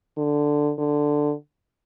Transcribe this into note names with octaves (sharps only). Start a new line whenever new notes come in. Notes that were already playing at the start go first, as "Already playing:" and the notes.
D3
D3